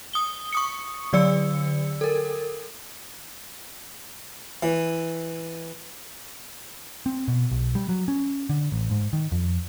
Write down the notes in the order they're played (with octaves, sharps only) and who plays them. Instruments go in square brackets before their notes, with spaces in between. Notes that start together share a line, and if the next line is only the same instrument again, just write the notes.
[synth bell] D#6 G7
C#6 D#6 C#7
D3 F#3 D5 E6 C#7
A4 A#4
[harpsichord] E3
[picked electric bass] C4
B2
B1
G3
F#3
C#4
D3
A1
G#2
D#3
F2